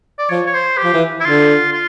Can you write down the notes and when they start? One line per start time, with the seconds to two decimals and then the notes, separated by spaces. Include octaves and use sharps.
0.19 D5
0.30 F3 C#5
0.47 C#5
0.54 C5
0.78 G4
0.84 F3
0.94 E3
1.21 E4
1.25 D3 F4
1.72 F4